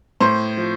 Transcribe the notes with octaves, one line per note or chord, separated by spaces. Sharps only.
A2 C5
F3